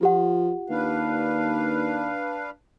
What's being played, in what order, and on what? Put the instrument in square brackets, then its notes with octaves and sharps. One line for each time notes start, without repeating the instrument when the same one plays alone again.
[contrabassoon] F3 [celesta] F4 G4 F#5
[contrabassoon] D#2 [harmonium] D4 B4 F5